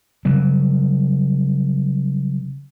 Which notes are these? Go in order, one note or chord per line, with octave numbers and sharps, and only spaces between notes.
C#3 F#3 G3